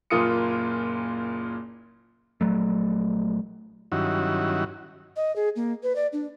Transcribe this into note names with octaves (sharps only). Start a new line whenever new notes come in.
F#1 A#2 A#3 F4 D#6 C#7
A#1 F#3 A3
G2 D#3 F#3 C#4 E4 F#4
D#5
G#4
A#3
B4
D5
D4